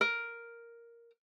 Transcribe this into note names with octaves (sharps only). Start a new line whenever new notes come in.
A#4